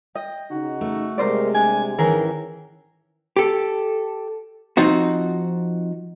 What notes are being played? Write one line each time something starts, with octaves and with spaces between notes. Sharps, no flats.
D#5 G5
C#3 D#4 F#4
A3
C3 G3 G#3 A#4 C5 D5
D4 G#5
G#2 D#3 E3 C#4 G#4 A#4
G4 A4
F3 C4 D#4 F#4